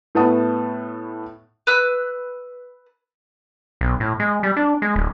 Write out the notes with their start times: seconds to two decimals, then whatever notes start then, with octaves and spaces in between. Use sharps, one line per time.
0.15 A2 A3 B3 F#5 A5 D#6
1.67 B4 E6 F#6
3.81 B1
4.00 A2
4.20 G#3
4.43 G3
4.57 D4
4.82 G#3
4.96 D1